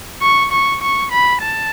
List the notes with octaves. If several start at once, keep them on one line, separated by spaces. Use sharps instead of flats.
C#6
C#6
C#6
B5
A5